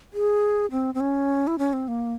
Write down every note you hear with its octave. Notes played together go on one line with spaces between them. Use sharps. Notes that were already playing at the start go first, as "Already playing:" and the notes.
G#4
C4
C4
C#4
E4
C#4
C4
A#3